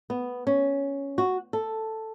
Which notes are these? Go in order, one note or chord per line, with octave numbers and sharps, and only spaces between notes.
B3
C#4
F#4
A4